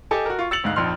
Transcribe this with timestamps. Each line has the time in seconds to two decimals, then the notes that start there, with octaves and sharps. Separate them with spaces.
0.11 G4 A4 D#5 G#5 A5
0.26 F#4 A#4
0.39 F4 C#6
0.51 E6 A6 C#7 F7 F#7
0.64 D2 G#2 F5 F#6
0.76 A#1 F2 D#4 C6 F6